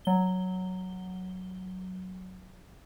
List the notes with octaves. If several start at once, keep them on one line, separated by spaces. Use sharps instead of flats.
F#3 G7